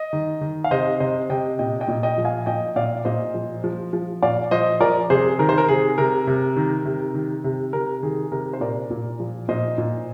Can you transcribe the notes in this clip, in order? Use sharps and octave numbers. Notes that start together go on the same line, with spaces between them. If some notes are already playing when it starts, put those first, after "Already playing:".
Already playing: D#5
D#3
D#3
F5
C3 C5 D#5
C3 C5 D#5
C3 D#5 G5
A#2 D#5 G5
D#5 G5
A#2
D#5 G5
F3
F5 G#5
A#2 D#5 G5
A#2 D5 F5
A#2 C5 D#5
F3
F3
F3
A#2 D5 F5
F3 C5 D#5
F3 A#4 D5
C3 G#4 C5
D#3 A#4
C5
A#4
C3 G#4
C3 A#4
C3
D#3
C3
D#3
C3
C3 A#4
D#3 G#4
C3 A#4
C5
A#2 A#4 D5
A#2
F3
A#2 C5 D#5
A#2